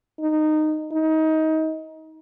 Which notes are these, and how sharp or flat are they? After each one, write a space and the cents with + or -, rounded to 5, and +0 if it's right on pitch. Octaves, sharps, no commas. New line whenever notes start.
D#4 -15
D#4 +25